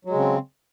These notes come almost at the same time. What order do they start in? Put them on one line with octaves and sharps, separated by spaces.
F#3 G#3 C#3 C4